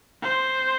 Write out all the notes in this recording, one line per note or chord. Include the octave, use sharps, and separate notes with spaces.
C5